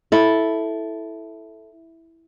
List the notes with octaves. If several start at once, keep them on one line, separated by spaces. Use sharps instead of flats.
E4 A4